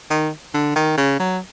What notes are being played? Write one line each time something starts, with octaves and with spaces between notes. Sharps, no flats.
D#3
D3
D#3
C#3
F#3